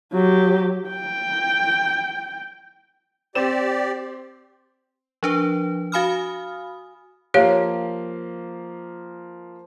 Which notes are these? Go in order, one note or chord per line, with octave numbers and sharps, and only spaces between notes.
F#3 G4
G5
C4 G4 D5 E7
F3 D4 B4
F#4 F5 G#5 B5 D#6 F6
F3 A#3 G4 C#5 F5